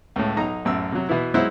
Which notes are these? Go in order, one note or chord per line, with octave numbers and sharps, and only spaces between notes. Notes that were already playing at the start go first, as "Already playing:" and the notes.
C#2 A2
B1 D#4 A#5
A1 F#2 E6
C3 F#3
B2 E3 B3 E4
F#3 G#3 E4 C5 F#5